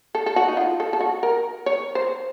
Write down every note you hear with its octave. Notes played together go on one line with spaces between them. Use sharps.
A4
A4
F#4
D#4
F4
A4
A4
F#4
A#4
C#5
C5